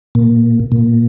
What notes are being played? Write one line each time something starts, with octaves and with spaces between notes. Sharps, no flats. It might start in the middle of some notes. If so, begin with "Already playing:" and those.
A#2
A#2